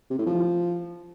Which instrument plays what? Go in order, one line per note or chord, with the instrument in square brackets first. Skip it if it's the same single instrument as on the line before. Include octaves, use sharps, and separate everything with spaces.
[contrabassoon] C3
A2
F3